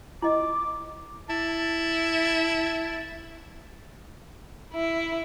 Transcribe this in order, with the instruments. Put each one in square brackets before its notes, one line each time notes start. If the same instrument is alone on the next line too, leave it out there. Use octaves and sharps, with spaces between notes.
[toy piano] E4 D#5 [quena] D6
[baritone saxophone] E4 [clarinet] A5
[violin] E4